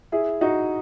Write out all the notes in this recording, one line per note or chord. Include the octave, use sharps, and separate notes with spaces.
E4 G#4
D#4 F#4